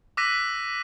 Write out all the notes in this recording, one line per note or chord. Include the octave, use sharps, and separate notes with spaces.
D6 E6 F#6 A#6 B6 D#7